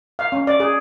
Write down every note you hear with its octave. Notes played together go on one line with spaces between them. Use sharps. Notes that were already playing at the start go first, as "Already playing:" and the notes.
F5
C#4
D5
G#4